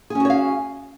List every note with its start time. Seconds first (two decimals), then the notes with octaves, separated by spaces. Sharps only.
0.10 G#4
0.15 C#4
0.20 F#4
0.25 C#5
0.30 F5